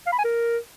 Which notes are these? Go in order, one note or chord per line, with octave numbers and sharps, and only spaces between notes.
F5
B5
G#5
A#4